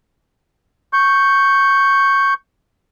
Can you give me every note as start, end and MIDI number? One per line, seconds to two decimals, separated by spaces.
0.93 2.34 85
0.93 2.34 91